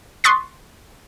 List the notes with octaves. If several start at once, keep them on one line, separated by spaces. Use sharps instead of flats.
C6 C#6 D#6 F#6 A6 B6